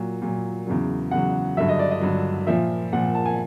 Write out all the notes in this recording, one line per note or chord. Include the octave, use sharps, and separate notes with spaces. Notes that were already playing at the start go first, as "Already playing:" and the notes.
Already playing: A#2 F#3
A#2 F#3
E2 C#3 F#3
E2 C#3 F#3 F#5
G2 D3 F#3 E5
D#5
D5
D#5
G2 D3 F#3
A#2 F3 E5
A#2 F3 F#5
A5
G#5